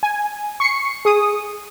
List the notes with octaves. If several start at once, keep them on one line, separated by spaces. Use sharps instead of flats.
G#5
C#6 C7 C#7
G#4 D#6